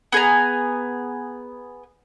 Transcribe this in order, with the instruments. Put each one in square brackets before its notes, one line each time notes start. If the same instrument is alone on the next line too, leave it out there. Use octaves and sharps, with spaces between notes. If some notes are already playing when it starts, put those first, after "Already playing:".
[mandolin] B3 G#4 G#5 A#5